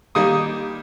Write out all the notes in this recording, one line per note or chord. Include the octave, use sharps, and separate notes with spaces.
D#3 G3 A#3 D#6